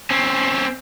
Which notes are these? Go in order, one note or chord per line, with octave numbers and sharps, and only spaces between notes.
C4 C#4